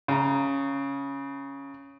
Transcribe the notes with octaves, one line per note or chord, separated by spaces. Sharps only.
C#3 A#5